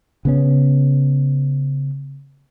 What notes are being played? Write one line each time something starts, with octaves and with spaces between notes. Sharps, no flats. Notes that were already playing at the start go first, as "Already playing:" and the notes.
C#3 B3 C#4